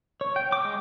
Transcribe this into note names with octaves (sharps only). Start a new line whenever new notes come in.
C#5
G5
D6
G#3